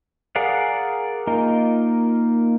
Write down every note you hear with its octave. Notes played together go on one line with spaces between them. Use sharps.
G#4 A#4 D5 F5 F#5
A#3 D#4 F4 A#4